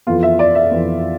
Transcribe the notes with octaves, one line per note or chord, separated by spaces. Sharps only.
F2 E3 B3 F4
E5
D5
E5
F2 E3 B3